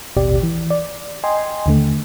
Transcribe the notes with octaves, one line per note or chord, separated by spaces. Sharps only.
A1 D#2 B2 G4 D5
E3
D5
D#5 G5 G#5 C6
D#2 D3 A3